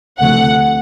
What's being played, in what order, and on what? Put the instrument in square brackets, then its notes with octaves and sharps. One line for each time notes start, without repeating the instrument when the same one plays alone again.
[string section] D2 C3 F3 A3 F#5